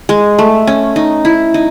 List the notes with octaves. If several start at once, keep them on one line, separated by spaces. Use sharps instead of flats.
G#3
A3
C#4
D#4
E4
D#4